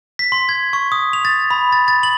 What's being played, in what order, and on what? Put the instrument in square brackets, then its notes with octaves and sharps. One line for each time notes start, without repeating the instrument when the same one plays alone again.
[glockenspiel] B6
C6
G#6
C#6
D#6
F7
A6
B5
A6
A6
F#7